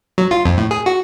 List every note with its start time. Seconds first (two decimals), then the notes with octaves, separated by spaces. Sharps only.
0.18 F#3
0.31 F4
0.45 F2
0.58 A2
0.71 G#4
0.86 F#4